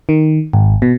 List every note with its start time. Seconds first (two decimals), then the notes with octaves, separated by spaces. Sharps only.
0.09 D#3
0.53 G#1
0.82 B2